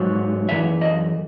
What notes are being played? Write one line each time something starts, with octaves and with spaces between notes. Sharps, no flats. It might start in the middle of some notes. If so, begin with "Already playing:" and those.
Already playing: G#2 F#3
F#2 E3 E5
D#5